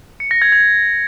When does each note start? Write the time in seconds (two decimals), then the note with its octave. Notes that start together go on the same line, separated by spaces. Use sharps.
0.20 C#7
0.31 A#6
0.42 G#6
0.52 G#6